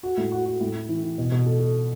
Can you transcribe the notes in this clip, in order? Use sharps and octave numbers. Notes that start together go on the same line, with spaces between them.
F#4
A2
F#4
F#4
A2
E4
E3
E3
B2
B2
A4
A4